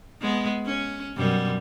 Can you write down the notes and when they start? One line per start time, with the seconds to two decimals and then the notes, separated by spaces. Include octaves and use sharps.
0.21 G#3 B3
0.65 C#4
1.17 F#2 B2 G3